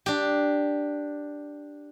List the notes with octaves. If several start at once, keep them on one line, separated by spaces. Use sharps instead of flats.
D4 G4